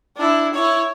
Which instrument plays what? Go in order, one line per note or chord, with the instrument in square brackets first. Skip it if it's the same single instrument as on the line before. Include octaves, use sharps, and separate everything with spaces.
[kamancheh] D4 E4
E4 C#5